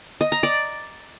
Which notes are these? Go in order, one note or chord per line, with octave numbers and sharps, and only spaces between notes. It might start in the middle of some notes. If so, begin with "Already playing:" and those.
D#5
A#5
D5